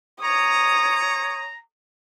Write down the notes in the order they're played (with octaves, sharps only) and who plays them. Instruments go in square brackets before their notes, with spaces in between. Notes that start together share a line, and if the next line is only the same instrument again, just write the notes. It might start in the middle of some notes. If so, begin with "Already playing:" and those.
[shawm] C#5 [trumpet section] A#5 [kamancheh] D#6